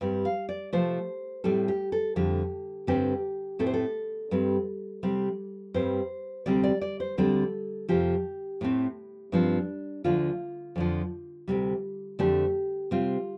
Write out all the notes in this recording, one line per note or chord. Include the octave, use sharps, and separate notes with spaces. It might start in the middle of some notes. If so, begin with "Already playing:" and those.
G2 G3 C4
F5
D5
C3 F3 A3 C5
A2 G3 C4 A4
G4
A4
F2 D3 G3 G4
G2 D3 G3 C4 G4
A2 A3 C4 A4
C5
A4
G2 G3 C4
C3 G3 C4
G2 G3 C4 C5
D2 C3 G3 C4 D5
D5
D5
C5
D2 D3 G3 C4 A4
F2 C3 F3 G4
A2 A3 C4
G2 F3 C4 D4
D2 D3 F3 A3 F4
F2 D3 F3
D2 C3 G3
F2 D3 A3 C4 G4
C3 G3 C4 F4